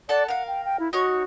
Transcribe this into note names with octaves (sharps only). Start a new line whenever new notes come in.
A4 D5 F#5 A5
A#4 F5 F#5
G5
G5
E4
D#4 F#4 C#5 C#6